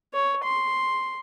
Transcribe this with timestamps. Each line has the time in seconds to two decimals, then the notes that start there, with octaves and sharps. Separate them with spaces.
0.13 C#5
0.43 C6